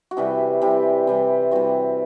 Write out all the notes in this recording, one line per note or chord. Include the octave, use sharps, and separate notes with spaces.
F#4
C3 E3 G3 G4
C3 E3 G3 G4
C3 E3 G3
C3 E3 G3 F#4